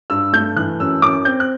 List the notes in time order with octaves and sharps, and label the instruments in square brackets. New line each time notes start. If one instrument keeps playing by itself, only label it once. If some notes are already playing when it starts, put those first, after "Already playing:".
[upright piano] G2 E6
A3 G6
E3 F#6
F#2 E6
F#2 D6
C4 G6
F#6